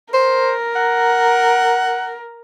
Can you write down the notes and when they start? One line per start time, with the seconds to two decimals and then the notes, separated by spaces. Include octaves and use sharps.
0.14 A#4 C5
0.75 F#5